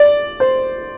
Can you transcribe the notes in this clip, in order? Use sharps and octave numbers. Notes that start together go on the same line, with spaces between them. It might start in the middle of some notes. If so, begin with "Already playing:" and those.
Already playing: D5
C5